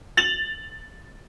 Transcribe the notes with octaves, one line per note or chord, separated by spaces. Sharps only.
A6 F7 F#7